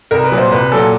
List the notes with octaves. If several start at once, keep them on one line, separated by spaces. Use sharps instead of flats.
C2 A#4
B4
A#2 F#3
C5
C2 B4
A#2 F#3 A4